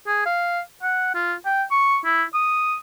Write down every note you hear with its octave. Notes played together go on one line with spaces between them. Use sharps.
G#4
F5
F#5
F4
G5
C#6
E4
D#6